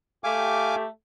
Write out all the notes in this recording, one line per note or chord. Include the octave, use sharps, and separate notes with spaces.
A3 G4 F5 G#5 D6